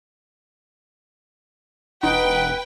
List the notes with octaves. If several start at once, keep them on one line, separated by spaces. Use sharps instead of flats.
E1 D#4 B4 F#5 G5